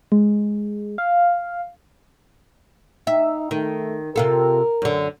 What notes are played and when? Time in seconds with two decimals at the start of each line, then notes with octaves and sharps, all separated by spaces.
0.12 G#3
0.98 F5
3.07 D#4 E5
3.51 D#3 A3
4.16 C3 F4 A4 A#4
4.82 F#2 D3